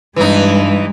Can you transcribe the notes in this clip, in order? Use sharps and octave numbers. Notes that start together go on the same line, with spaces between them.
G2 E3 G3 G#3 D#4